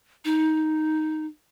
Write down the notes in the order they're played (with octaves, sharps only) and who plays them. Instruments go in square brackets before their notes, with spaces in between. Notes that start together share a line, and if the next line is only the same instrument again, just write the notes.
[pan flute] D#4